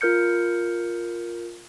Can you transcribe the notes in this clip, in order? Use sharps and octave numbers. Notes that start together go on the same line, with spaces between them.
F4 A#4 F6 G6 C#7